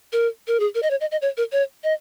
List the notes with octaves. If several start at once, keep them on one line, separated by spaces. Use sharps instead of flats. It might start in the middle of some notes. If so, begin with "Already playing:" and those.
A#4
A#4
G#4
A#4
D#5
C#5
D#5
D#5
C#5
A#4
C#5
D#5